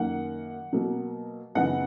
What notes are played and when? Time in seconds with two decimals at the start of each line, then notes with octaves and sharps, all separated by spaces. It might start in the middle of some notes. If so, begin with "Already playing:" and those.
Already playing: F#2 D#3 A#3 F#5
0.73 B2 F#3 A#3
1.55 F#2 C#3 E3 B3 D#4 F#5